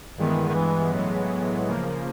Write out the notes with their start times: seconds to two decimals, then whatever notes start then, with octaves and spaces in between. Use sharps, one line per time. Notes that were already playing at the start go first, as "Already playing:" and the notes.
0.17 G2 D#3 E3 G#3 B3
0.49 D#3
0.55 E3
0.92 A2 E3 F#3 G#3 B3
1.68 C#3 F3 A#3